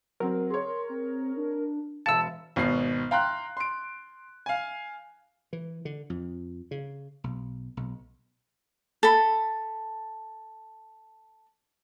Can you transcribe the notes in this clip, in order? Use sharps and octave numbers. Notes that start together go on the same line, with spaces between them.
F#3 C4 A#4
G#4 C#5 C6
C4
D4
E1 E5 F5 A5 E6 C#7
G#1 B2 C7
F5 G5 A#5 C6 F#6
C6 D7
F5 G#5
E3
D3
F2
C#3
B1
B1
A4 B5